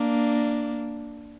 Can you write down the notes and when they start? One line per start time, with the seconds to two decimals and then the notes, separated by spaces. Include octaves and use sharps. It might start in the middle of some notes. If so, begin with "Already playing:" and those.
Already playing: A#3 D4